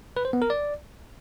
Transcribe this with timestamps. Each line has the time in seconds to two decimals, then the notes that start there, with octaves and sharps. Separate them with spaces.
0.17 B4
0.25 C5
0.33 B3
0.42 A#4
0.50 D5